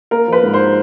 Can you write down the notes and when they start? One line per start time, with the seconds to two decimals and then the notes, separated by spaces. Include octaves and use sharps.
0.11 A#3 A#4
0.27 F3
0.32 B4
0.43 G#2
0.54 C5